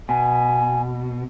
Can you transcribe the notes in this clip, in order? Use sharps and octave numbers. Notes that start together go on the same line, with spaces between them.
B2 G#5